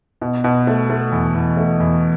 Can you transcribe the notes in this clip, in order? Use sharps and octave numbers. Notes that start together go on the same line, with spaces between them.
B2
B2
A3
A3
E2
E2
A3
E2